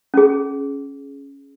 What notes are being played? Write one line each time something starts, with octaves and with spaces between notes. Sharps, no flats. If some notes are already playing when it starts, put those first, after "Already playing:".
C#4 G#4